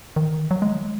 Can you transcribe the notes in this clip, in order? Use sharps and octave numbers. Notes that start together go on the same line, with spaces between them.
D#3
F#3
G#3
F#3
G#3